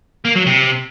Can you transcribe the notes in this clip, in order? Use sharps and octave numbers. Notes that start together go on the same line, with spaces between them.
A#3
F#3
C3